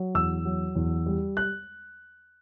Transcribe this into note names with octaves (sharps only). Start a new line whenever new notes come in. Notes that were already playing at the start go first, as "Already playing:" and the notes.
Already playing: F#3
E2 E6
F#3
E2
G3
F#6